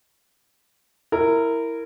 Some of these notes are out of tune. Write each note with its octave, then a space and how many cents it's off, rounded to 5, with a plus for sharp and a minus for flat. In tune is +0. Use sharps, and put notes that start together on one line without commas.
E4 +0 A#4 -15